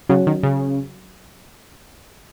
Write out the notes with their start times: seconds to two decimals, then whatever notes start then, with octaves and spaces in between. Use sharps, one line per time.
0.09 C#3 F#3 C#4 F#4
0.27 D#3
0.43 C#3